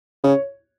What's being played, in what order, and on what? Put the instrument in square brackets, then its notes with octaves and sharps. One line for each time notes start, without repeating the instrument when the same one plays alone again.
[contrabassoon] C#3 [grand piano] C#5